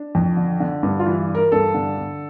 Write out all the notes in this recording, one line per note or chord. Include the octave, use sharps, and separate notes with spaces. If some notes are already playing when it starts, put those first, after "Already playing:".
Already playing: D4
F2
D3
D3
G2
F4
E3
E3
A#4
G2 A4
D3
D3